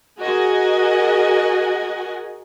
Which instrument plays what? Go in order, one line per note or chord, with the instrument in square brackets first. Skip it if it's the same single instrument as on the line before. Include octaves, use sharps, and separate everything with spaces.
[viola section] F#4 G#4 A#4 D#5 F#5 G#5